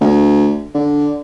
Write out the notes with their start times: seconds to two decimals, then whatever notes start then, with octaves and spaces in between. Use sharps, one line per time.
0.01 D2
0.74 D3